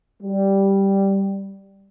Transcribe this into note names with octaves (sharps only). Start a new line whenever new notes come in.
G3